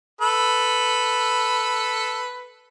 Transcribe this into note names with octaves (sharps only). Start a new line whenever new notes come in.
A4 B4